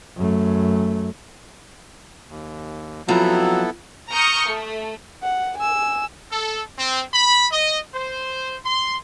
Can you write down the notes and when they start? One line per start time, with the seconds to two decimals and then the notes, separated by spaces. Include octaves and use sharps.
0.17 F#2 A3
2.29 D#2
3.08 F3 F#3 B3 C4 E4 A4 A#5
4.11 A#5 C#6 D#6 F6 G6 C#7
4.49 A3
5.23 F#5
5.57 G#5 E6
6.31 A4
6.78 C4
7.13 B5
7.52 D#5
7.94 C5
8.65 C6